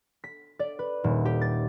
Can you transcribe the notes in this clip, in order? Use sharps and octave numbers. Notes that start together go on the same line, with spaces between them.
B6
D5
B4
D#1
G4
A6